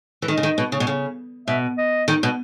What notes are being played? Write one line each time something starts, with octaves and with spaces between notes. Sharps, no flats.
E3
D#3 D#5
C#3
D#3
B2
C#3
B2
C#3
B2 E5
D#5
D#3
B2